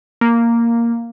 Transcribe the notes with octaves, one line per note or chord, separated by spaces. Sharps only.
A#3